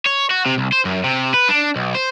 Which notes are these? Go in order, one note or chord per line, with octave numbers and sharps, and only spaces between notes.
C#5
F#4
C3
C2
C5
F#2
C3
B4
D4
B1
C5